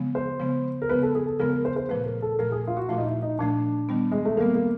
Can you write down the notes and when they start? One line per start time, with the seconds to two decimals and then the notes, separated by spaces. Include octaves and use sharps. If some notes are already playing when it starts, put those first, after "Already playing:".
Already playing: C#3 F3 G#3 B3
0.15 C5
0.40 C#3 F3 G#3 B3
0.82 A#4
0.89 C#3 F3 G#3 B3 B4
1.03 A4
1.15 G#4
1.27 A4
1.39 C#3 F3 G#3 B3 A#4
1.52 A#4
1.65 C5
1.76 C5
1.89 A#2 F3 A3 B4
2.06 A#4
2.22 A4
2.39 A#2 F3 A3 A#4
2.52 G#4
2.67 F4
2.77 F#4
2.89 A#2 F3 A3 F4
2.98 D#4
3.05 E4
3.22 D#4
3.39 A#2 F3 A3 D4
3.89 D#3 G3 B3
4.12 G#3
4.25 A3
4.37 D#3 G3 A#3 B3
4.55 A#3